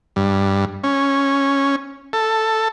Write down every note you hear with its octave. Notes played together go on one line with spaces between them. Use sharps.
G2
C#4
A4